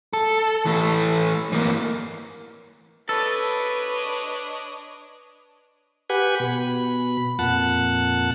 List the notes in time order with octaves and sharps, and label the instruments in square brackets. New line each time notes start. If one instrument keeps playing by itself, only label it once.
[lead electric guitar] A4
E3 A3
E3 A#3
[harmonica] D4 C#5 D#5 [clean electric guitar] A4 [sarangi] B4
[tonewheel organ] G4 B4 F#5 G#5
B2 B5
F2 A#2 F#5 A5 F#6